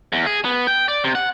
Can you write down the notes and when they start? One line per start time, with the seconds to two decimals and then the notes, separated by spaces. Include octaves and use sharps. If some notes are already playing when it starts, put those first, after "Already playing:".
0.13 E2
0.26 G#4
0.45 B3
0.67 G5
0.88 D5
1.04 C3
1.15 F#5